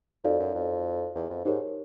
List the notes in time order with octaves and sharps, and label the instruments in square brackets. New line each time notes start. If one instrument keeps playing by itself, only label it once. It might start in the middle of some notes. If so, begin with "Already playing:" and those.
[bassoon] F2 [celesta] D#4 F#4 A4 D5 F5
[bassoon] F#2
F2
E2
F2
[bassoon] G#2 [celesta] D#4 G4 A#4 C#5